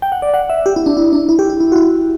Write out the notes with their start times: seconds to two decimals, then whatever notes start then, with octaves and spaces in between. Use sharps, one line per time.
0.02 G5
0.12 F#5
0.22 D5
0.34 F#5
0.50 E5
0.66 G4
0.76 E4
0.86 D4
0.97 E4
1.13 D4
1.29 E4
1.39 G4
1.50 E4
1.60 E4
1.72 F#4
1.76 E4